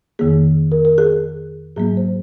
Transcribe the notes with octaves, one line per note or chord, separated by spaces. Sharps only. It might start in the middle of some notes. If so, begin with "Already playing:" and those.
F2 D#3 A#3 G#4
A#4
A#4
G#4
G#2 F#3 A#3 G#4
C5